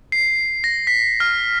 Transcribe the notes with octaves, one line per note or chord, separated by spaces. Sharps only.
C7
A#6
B6
F6